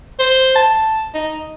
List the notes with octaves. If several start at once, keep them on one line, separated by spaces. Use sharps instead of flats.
C5
A5
D#4